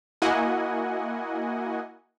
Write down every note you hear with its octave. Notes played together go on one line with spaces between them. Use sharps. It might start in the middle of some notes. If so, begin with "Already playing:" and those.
A#3 E4 F#4 D#5 F#5 G#5